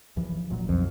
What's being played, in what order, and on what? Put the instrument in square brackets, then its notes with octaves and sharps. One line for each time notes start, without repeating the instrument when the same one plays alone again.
[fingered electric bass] D#2 E3 F3
E1 A#2 F#3
[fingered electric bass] B1 [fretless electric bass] F2